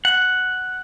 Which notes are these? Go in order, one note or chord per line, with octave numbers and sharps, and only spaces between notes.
F#5